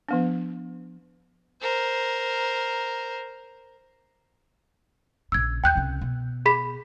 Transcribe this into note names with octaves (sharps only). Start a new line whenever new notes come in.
F3 B3 D4
A#4 C5
A#1 C#3 E6 G#6
D#2 G5 F#6 G6
C2 C#3
B2
G#4 B5 B6